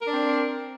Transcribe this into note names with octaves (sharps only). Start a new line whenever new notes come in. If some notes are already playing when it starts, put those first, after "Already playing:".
C4 D4 A#4